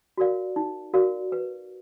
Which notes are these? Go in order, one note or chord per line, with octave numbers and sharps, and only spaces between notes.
F#4 A#4 D5 F5
D#4
F#4 A#4 D5 F5
B4